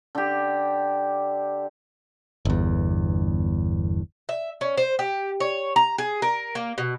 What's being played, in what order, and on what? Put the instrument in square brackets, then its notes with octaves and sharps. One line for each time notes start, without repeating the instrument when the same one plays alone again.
[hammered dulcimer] D3 G4
[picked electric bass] G1 E2
[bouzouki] E5
C#4
C5
G4
C#5
A#5
G#4
A#4
A#3
B2